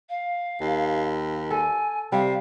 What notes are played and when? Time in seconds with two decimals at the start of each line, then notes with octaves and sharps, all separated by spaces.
0.09 F5
0.61 D#2
1.51 A4 G#5
2.12 C3 G3 F5